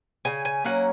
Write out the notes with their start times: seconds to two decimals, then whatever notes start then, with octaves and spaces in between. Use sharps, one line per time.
0.25 C#3 G#5
0.45 G#5
0.64 F#3 A#3 C#4 F#5